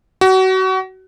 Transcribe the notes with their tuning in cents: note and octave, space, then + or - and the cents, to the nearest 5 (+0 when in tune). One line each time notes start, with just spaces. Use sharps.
F#4 +30